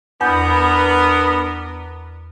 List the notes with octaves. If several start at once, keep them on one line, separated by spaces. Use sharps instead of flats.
E2 B3 D4 A#4 F#5 G6